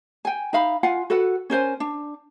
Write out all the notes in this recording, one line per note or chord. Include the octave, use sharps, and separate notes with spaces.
G5 G#5
D#4 E5 F5 B5
F4 F5 F#5 G#5
F#4 A4 B4 F#5
C#4 A#4 C5 G#5
D4